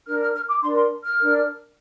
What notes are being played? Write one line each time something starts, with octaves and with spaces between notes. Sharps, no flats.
D4 A#4 F6
F6
F6
D6
D4 A#4 C6
C6
F6
D4 A#4